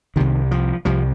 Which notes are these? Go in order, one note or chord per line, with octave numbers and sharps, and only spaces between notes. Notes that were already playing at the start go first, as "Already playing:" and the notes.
C2 C3 D#3
F3
C2 C3 F3